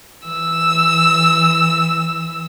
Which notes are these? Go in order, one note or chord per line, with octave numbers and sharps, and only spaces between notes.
E3 E6